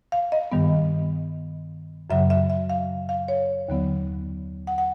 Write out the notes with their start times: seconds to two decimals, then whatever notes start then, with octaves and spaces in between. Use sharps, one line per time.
0.12 F5
0.32 D#5
0.52 G2 D#3 G3 B3
2.10 F#2 C#3 F#3 E5
2.30 E5
2.50 E5
2.70 F5
3.09 F5
3.28 C#5
3.68 D#2 D3 F#3 B3
4.67 F#5
4.78 F#5